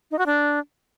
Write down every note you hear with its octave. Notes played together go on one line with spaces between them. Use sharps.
D#4
F#4
D4